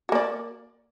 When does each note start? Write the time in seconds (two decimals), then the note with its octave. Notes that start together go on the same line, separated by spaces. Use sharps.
0.09 F#4
0.12 A#3
0.15 D5